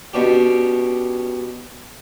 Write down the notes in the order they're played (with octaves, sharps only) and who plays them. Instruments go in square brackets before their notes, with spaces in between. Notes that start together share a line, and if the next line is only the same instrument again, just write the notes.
[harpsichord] B2 C#4 D4 G4